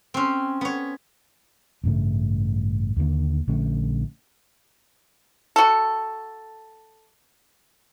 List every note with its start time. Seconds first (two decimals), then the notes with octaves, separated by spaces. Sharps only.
0.14 C4 C#4
0.61 B3 C#5
1.84 A1 G2 C#3 A3
2.96 D#2 D3 D#3 A#3
3.48 A#1 D3 A3 C#4
5.56 F#4 A4